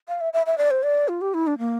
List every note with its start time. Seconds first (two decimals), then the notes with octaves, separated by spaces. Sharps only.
0.08 F5
0.21 E5
0.33 E5
0.46 E5
0.58 D5
0.71 C5
0.83 D5
1.08 F4
1.21 G4
1.34 E4
1.47 D4
1.59 A#3